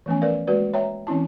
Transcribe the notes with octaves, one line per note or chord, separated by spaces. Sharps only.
E3 F3 A3 B3 C#4 G#5
A#4 B4 D5 F5
G#3 A#3 F#4 B4 D5
C#5 E5 G5 A#5
E3 C4 C#4 E4 A5